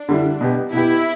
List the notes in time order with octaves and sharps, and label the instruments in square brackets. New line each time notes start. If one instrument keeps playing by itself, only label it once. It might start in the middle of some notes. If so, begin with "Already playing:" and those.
Already playing: [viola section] D4
[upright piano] D3 G3 E4
B2 B3 G4
[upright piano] B2 B3 G4 [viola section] E4